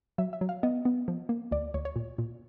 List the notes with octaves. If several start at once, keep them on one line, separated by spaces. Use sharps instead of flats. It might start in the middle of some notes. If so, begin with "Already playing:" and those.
F#3 E5
E5
F#3
F5
B3 D#5
B3
F3
A#3
D2 D5
D2 C#5
C#5
A#2
A#2